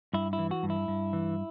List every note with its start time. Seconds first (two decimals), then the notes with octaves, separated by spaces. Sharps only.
0.13 G2 E4
0.33 E4
0.39 E3
0.51 F#4
0.63 G2
0.70 E4
0.88 G2
1.13 E3